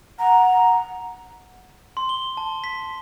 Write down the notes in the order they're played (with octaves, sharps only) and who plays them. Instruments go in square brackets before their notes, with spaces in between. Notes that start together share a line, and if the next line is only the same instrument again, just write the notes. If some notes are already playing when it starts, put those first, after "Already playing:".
[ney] F#5 [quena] A#5
[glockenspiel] C6
G7
A5
B6